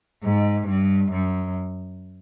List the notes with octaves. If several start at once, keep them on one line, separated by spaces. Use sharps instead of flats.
G#2
G2
F#2